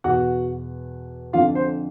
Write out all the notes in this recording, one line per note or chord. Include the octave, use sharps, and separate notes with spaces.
E2 B2 F#4 F#5
F2 D3 F4 F5
C5